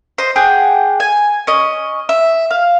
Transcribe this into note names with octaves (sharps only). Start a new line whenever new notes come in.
C5 D#5
G4 G#4 F#5
G#5
C#4 D#5
E5
F5